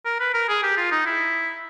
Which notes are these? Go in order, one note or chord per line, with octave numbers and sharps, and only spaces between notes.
A#4
B4
A#4
G#4
G4
F4
D#4
E4